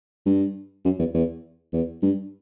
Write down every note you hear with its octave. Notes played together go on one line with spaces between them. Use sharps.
G2
F#2
E2
E2
E2
G2